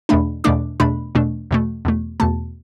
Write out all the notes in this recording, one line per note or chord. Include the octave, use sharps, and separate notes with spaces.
E2 B2 A3 D4 B5
E2 B2 A3 D4 D6
E2 B2 A3 D4 B5
E2 B2 A3 D4
E2 B2 A3
E2 B2 A3
E2 B2 A3 A5